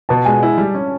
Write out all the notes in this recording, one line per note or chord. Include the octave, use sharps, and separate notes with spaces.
B2 A5
G#3 G#5
E4
G3
C#4